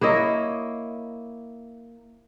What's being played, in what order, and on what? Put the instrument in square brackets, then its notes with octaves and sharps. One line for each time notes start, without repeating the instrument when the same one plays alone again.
[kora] A#3 E4 C#5 D#5